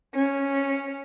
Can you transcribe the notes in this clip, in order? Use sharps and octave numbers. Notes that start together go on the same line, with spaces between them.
C#4